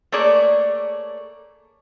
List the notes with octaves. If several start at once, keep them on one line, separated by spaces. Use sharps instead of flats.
A3 A#3 G#4 C#5 D5